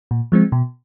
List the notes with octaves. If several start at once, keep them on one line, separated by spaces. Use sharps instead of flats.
A#2
F3 G#3 C4
B2